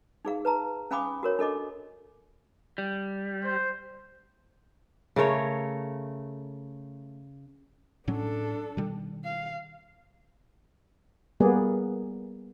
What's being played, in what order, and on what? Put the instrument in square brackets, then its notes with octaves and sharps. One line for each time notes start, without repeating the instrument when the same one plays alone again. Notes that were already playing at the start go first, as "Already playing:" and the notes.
[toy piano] D#4 G#4 F5
B4 A5 A#5
C#4 F5 G#5 B5 D6 D#6
F#4 A#4 C#5
D4 A4 D#5 D6
[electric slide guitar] G3
[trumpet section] C5
[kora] C#3 A3 A#4 C#5
[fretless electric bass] A2 F#3 C#4 [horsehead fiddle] D4 A4
[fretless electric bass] B2 D#3 G3
[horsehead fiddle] F5
[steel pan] G3 A#3 B3 G#4 D5